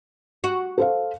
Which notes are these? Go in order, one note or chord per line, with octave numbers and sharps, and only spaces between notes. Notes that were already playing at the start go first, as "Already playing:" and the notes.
F#4
A4 C5 F5